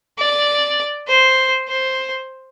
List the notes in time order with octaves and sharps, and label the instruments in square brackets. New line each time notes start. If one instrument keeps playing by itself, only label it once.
[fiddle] D5
C5
C5